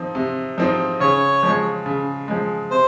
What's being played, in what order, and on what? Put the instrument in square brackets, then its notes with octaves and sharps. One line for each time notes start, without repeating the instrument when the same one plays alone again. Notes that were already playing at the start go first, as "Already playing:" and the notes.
Already playing: [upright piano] F3 C4 D#4
C3
F3 C4 D#4
[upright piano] C#3 [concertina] C#5
[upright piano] F3 G#3
C#3
F3 G#3
[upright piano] C3 [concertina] C5